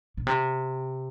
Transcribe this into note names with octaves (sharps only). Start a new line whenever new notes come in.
A#2
C3